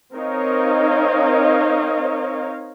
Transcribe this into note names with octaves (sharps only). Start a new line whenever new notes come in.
C4 D#4 A#4 C#5 D#5 F5